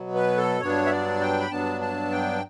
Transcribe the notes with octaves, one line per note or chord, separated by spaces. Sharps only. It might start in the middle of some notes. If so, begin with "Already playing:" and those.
Already playing: B2 F#3 B3
B4
A4
G2 F#3 B3 D4 C#5
E5
D5
G5
B5
G2 F#3 B3 D4 A5
A5
G5